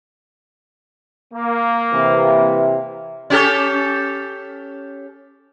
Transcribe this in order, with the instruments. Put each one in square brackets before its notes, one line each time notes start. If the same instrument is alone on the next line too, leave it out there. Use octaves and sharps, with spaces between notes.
[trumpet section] A#3
[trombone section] C3 E3
[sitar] C#4 G4 A4